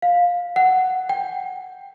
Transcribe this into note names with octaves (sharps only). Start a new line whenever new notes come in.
F5
F#5
G5